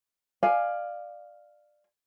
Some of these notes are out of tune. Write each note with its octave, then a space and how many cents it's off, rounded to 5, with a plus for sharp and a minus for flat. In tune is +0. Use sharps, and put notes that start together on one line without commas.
D5 +20 F5 +0 G#5 +0